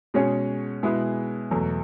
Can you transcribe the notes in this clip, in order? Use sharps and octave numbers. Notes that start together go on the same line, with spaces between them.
B2 G#3 C#4 G#4 C#5
B2 G#3 B3 E4 G#4
E2 B2 F#3 A3